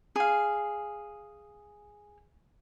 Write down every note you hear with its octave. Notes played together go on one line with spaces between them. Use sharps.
G#4 F5